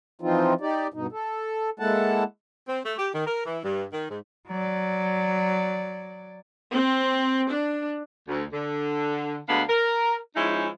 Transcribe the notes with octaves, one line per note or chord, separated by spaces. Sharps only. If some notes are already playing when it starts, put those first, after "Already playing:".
E3 F3 C4 D#4 F4
D#4 G4 D5
G2 B2 D#4
A4
G#3 A#3 E4 A4 F#5 A5
C4
A3
G4
D#3
A#4
E3
G2
D#3
G#2
F#3 D5
C4
D4
D2
D3
D2 D3 G#3 B3 D4 F5
A#4
F3 G#3 C#4 D#4 E4